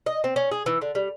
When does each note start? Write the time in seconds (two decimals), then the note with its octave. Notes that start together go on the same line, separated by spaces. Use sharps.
0.06 D#5
0.24 C4
0.36 C#4
0.51 G#4
0.66 E3
0.81 D3
0.95 G3